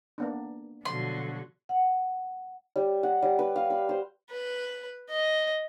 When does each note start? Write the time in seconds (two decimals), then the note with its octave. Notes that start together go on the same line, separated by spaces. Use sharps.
0.18 A#3 B3 D4
0.85 B2 D3 F3 F#3 C6
1.69 F#5
2.76 G3
3.03 F#5
3.22 G3
3.39 B4
3.56 F5
3.70 B5
3.89 C5
4.30 B4
5.10 D#5